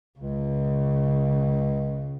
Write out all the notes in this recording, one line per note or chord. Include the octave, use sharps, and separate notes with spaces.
C#2 C#3